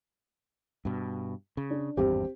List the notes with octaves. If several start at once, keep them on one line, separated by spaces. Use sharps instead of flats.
G2 B2
C#3
D4
G#1 E2 G2 C4 G4